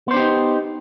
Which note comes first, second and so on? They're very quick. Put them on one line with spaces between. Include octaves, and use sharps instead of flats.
B3 C5 D4 G4 D#4